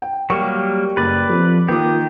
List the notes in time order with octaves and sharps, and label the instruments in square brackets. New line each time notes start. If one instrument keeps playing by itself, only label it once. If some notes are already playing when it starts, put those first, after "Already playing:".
[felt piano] G5
[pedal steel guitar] F#3 G3 A#3 [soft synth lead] G4 [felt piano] A#4 C#6
[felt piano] F#1 [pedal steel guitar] B4 D5
[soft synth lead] F3 [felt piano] C4 A4
[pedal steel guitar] D#3 G4 [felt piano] A#3 F4 D6 [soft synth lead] D#6